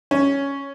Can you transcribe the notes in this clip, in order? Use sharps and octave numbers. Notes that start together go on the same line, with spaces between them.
C#4